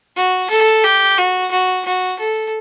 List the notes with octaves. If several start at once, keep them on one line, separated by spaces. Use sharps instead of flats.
F#4
A4
G4
F#4
F#4
F#4
A4